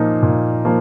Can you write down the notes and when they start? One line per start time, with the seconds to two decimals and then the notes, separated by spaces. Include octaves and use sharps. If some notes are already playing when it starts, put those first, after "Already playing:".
Already playing: A#2 F3 A#3 D#4
0.23 A#2
0.65 F3 A#3